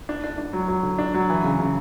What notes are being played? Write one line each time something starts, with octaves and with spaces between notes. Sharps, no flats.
D4
D4
D4
F#3
F#3
D3
D4
F#3
E3
C#3
C#3